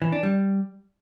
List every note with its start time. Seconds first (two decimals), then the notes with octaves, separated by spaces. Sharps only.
0.02 E3
0.12 D4
0.23 G3